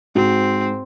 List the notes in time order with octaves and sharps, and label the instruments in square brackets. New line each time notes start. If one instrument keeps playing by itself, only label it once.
[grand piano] G#2 [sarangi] C4 [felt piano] F#4